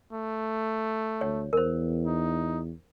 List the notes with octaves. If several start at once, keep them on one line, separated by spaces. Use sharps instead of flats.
A3
D2 C#5
E2 A#4 C5
D#4